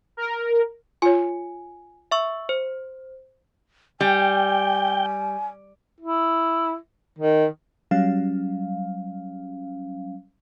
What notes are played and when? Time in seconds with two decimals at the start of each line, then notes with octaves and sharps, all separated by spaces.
0.17 A#4
1.02 F4 C#5 G#5
2.11 E5 C#6 E6
2.49 C5
4.01 G3 G5 G#5
6.01 E4
7.19 D#3
7.91 F#3 G3 C#4 F5